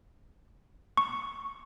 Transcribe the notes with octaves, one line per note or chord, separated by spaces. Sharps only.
C#6